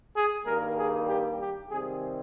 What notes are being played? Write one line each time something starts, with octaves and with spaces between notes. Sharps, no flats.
G#4
G2 D#3 G3 A#3 A#4
G#4
G4
G4
C3 D#3 G3 C4 G#4